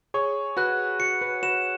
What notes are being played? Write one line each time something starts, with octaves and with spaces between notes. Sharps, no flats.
G#4 C#5 C#6
F#4 B4 F#6
F#4 C#7
F#4 B4
F#4 B4 E7